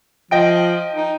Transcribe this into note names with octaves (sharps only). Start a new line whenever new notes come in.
F3 D#5 G5 D7
D#4